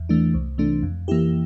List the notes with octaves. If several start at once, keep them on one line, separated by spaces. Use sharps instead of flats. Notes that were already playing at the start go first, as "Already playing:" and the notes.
Already playing: E2
E3 A3 D4
C2
C3 E3 A3 D4
F2
E3 A#3 E4 G4